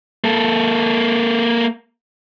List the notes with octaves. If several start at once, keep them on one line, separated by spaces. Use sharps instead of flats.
A#3 A4